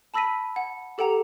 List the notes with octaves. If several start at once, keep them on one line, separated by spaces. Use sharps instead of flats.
A5 B5 E6 A#6 B6 D#7
F#5
G4 A4 F#5 G5 A#5 F7